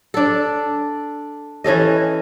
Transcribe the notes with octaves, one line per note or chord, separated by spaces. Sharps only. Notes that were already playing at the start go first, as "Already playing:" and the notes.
D4 A4
E3 C#4 A4 D#5